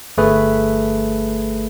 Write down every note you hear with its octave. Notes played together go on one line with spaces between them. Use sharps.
G1 A3 G#4 B4